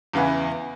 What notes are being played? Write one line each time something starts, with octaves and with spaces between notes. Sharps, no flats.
E2 C#3 E3 B3